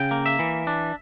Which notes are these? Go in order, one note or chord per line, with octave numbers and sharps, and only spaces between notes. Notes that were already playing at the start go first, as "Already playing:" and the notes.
Already playing: C#3 G5
A#3
E5
E3
D4